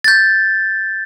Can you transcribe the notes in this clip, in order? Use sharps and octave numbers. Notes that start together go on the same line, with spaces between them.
G6 A6